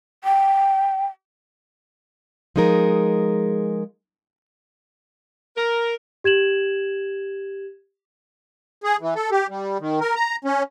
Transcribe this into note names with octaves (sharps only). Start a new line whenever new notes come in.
G5
F3 G#3 D#4 G#4 A#4
A#4
G4 G#6 E7 F#7
G#4
E3
A4
G4
G3
D#3
A#4
A#5
C#4